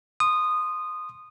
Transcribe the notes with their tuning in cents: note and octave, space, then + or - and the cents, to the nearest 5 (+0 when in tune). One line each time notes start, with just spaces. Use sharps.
C6 +0 D#6 -15